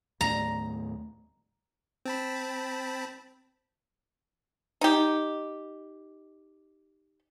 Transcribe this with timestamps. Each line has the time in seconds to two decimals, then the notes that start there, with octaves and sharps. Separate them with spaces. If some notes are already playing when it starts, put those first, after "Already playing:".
0.21 D#2 A2 A3 A#5
2.05 C4 A5 B5
4.81 D#4 G4